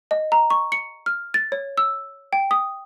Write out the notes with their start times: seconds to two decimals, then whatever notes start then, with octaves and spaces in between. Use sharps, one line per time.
0.11 D#5
0.32 A#5
0.50 C#6
0.72 C#7
1.06 F6
1.34 A6
1.52 C#5
1.78 E6
2.33 G5
2.51 D#6